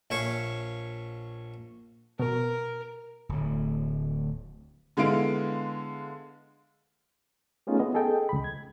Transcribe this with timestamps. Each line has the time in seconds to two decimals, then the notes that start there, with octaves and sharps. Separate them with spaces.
0.10 A#1 C#5 E5 F5 G#5 C#6
2.19 B2 A#4
3.29 D1 A2
4.97 D3 G#3 B3 E4 F5 D7
7.67 A3 B3 C#4 D#4 F4 G#4
7.79 B3 D#5
7.94 G#4 A4 D#5 G5
8.29 C#2 B5
8.44 G#6